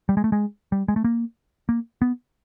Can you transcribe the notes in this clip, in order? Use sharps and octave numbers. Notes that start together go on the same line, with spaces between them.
G3
G#3
A3
G#3
G3
G#3
A3
A#3
A#3
B3